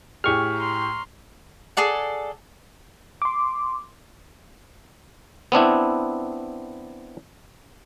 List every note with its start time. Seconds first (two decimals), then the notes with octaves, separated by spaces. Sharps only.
0.24 A2 G4 G#4 C#6 F6
0.56 A#5 C6
1.77 G#4 A4 D5 F#5
3.22 C6 D6
5.52 B3 C4 D4 E4